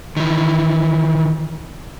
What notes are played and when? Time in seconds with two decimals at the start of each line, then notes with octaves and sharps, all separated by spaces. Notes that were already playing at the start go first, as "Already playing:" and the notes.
0.17 D#3 E3